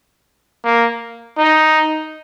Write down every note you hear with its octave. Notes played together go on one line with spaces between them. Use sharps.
A#3
D#4